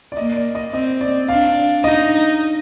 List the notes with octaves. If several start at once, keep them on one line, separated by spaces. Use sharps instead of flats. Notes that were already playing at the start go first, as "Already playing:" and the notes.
D5
A#3 D#5
D5
D#5
C4 D#5
D5
D4 F5
D#4 D#5